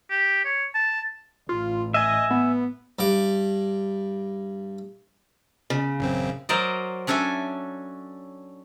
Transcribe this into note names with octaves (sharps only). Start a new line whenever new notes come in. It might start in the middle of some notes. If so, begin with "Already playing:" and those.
G4
C#5
A5
A1 F4
D#5 E5 G#5
B3
G2 D6
C#3
A1 F#2 C4
F#3 A#4 C5 D5 D#5
C#4 D4 A4 E5 G#5